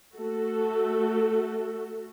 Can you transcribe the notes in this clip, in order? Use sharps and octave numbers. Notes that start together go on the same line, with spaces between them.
A3 F#4 A4